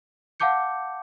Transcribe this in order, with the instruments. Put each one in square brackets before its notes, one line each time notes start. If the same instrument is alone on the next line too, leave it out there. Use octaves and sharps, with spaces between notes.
[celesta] F5 F#5 A5 D6 G6 C#7